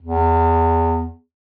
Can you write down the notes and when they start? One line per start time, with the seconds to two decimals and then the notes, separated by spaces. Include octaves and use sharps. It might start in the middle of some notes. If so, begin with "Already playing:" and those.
0.03 E2